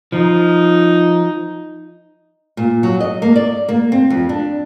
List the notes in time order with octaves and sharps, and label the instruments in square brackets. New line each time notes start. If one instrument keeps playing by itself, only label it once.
[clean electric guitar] F3 [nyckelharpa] D#4
[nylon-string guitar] A#2
F#3
D#5
A#3
D5
A#3
C4
F2
D4